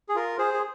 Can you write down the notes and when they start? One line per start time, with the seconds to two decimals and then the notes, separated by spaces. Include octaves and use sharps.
0.09 G#4
0.15 F4 A#4
0.38 G#4 C5
0.53 G#4